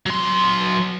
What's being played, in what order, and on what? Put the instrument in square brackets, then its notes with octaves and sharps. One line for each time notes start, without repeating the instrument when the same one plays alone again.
[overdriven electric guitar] F#3 C6